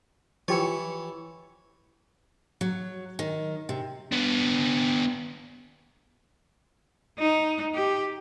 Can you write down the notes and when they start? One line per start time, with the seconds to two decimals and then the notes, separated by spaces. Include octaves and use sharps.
0.48 E3 F3 G4 C#5 C#6
2.61 F#3
3.19 D#3
3.69 C3
4.12 B3 D4
7.19 D#4
7.75 G4